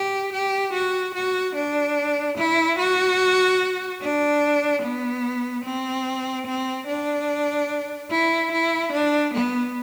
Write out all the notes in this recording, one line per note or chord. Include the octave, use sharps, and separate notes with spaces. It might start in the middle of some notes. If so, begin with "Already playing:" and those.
Already playing: G4
G4
F#4
F#4
D4
E4
F#4
D4
B3
C4
C4
D4
E4
E4
D4
B3